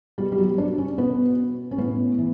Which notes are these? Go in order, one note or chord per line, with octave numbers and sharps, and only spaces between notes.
B2 G3
G3
F#3
D4
C#4
B2 B3
C#4
A2 B3
E3